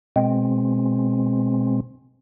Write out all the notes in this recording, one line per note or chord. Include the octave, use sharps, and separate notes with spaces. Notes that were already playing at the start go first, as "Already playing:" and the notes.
B2 G#3 C4